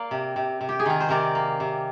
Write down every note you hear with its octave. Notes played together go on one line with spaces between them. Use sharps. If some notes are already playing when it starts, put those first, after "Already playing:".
Already playing: A#3 D5
C3
C3
C3
G4
G#4
D#3 A#4
C5
C3 A#4 D5
A#3
C3